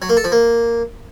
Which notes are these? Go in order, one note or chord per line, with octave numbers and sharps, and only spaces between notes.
F#3
A#3
A4
F3
A#3